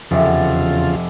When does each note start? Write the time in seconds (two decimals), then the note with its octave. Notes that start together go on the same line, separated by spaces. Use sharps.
0.11 F1 E2 C#3 F4